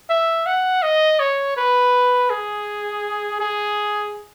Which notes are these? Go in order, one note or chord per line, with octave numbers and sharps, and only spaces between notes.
E5
F#5
D#5
C#5
B4
G#4
G#4